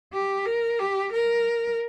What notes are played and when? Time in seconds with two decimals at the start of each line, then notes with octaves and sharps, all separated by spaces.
0.13 G4
0.46 A#4
0.79 G4
1.12 A#4